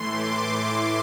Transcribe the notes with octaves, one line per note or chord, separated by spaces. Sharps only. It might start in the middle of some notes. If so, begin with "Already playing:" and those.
Already playing: A2 E3 A3 C6
D6
C6